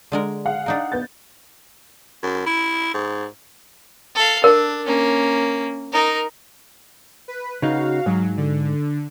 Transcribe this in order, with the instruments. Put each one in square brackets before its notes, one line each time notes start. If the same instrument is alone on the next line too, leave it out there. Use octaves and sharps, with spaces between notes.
[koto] D3 G#3 A#4
[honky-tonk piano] G#4 F5 F#5
[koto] D4 D#4 A#4
[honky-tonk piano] B3 G6 A6
[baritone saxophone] F#2
E4
G#2
[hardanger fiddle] A4 F5
[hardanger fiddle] D4 [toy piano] A#4
[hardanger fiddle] A#3 C#4
D#4 A#4
[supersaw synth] B4
[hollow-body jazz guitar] C#3 D#4 [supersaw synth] F#4 F5
[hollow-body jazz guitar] G#2 [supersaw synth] F#3
[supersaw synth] D3